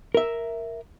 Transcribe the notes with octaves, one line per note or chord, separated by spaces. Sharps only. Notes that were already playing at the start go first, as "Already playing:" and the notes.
A#4 E5